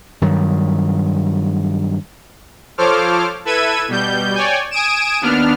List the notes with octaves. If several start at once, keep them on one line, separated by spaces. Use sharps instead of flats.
G2 D#3 F#3
F3 A4 C5 C#5 D6 F6
E4 A4 B4 E6 G#6 D#7
B2 G3 G6
C#5 D5 G5 G#5
G#5 D#6 D7 E7
D#2 B3 D4 F6